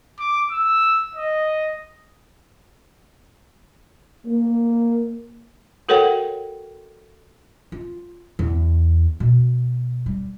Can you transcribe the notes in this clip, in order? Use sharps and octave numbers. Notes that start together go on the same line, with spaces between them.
D6
E6
D#5
A#3
F#4 A4 A#4 C#5 F#5 G5
F4
E2
B2
G3